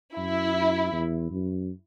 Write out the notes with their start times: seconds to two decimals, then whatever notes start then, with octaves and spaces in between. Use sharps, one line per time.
0.17 F#2 E4
0.92 E2
1.30 F#2